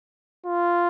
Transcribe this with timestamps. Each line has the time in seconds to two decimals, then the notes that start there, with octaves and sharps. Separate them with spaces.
0.46 F4